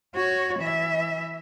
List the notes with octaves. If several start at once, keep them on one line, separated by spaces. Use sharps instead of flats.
F#4 C#5
E3 E5